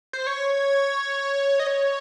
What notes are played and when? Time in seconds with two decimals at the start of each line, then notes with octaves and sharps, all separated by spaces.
0.13 C5
0.27 C#5
1.60 D#5
1.67 C#5